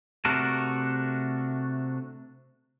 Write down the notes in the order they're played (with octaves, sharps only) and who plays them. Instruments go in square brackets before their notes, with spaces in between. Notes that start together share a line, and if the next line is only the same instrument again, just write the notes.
[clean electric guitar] C3 A3 D4 F#4 A4 A#4